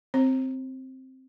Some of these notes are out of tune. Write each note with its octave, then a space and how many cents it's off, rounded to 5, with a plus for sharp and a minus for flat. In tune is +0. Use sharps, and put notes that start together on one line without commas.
C4 +0 C5 +40